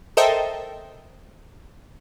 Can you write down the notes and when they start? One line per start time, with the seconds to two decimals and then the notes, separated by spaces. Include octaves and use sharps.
0.17 A4 A#4 C5 D#5 E5 G5